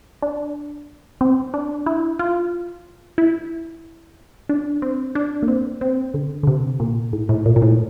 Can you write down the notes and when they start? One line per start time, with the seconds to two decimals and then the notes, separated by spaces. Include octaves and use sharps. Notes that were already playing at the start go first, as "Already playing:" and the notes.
0.22 D4
1.21 C4
1.54 D4
1.86 E4
2.19 F4
3.18 E4
4.49 D4
4.82 C4
5.15 D4
5.43 A#3
5.48 C4
5.81 C4
6.14 D3
6.43 D3
6.47 C3
6.80 A#2
7.13 A2
7.29 A2
7.46 A#2
7.56 A#2
7.62 A2